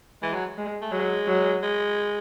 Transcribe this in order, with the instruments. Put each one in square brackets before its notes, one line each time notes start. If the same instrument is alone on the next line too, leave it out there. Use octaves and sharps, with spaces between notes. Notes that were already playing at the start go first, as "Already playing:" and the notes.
[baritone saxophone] E3 [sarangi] G#3
[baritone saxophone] F#3
[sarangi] G#3
[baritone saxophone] A3
[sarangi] F#3 [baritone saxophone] G#3
[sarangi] F#3
[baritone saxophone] G#3